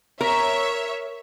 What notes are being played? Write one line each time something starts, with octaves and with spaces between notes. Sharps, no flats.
A#4 C#5 E5